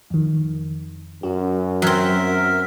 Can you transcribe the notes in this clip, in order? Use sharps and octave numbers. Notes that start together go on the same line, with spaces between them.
F2 D#3
F#2 F#4
F#3 C4 A#4 E5